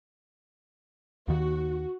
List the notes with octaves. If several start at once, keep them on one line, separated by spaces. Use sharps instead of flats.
D#2 D#3 F#4